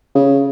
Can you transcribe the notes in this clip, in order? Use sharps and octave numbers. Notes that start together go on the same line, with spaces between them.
C#3